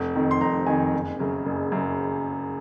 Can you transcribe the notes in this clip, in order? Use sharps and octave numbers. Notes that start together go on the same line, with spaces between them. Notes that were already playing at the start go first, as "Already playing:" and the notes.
Already playing: F1
F2 D#3
C6
F1 A#5
F2 D#3 G#5
F#1
F#2 C#3
F#1
F#2 C#3